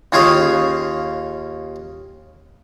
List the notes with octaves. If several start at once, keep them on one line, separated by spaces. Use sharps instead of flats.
D#2 C#4 F4 G#4 F5